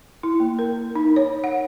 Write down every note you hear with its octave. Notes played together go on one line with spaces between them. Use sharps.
E4
A#3
A#4
D#4
C#5
F#5